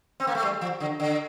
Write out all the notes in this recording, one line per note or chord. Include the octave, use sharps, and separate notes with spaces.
C4
A#3
A3
G3
F3
D3
D3